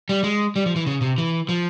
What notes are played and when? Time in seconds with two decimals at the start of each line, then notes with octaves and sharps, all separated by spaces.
0.09 G3
0.24 G#3
0.56 G3
0.66 F3
0.76 E3
0.87 C#3
1.01 C3
1.18 E3
1.49 F3